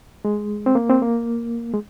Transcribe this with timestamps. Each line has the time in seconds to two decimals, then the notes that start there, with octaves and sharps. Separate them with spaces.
0.25 G#3
0.66 C4
0.75 A#3
0.90 C4
1.02 A#3
1.74 G#3